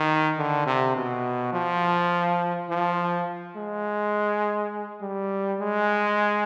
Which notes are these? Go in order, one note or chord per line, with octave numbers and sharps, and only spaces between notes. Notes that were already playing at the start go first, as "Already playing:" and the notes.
Already playing: D#3
D3
C3
B2
F3
F3
G#3
G3
G#3